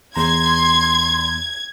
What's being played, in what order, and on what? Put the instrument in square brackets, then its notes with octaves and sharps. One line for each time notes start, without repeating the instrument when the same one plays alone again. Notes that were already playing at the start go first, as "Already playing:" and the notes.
[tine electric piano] E2 A#5 [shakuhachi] C6 [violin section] G#6